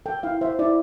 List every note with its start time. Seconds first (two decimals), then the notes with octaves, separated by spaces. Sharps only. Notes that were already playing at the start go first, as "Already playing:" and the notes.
0.06 A4 G5
0.23 E4 F5
0.41 C5 E5
0.59 E4 D5